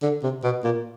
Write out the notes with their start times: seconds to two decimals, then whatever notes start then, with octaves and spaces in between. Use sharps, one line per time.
0.02 D3
0.23 C3
0.44 B2
0.64 A#2